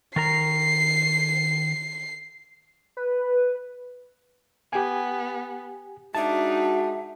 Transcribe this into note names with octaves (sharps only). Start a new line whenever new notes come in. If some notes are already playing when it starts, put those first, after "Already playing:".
D#3 A#4 A#5 C7
B4
B3 G4 G#5
G#3 D4 D#4 F#4 E5 A5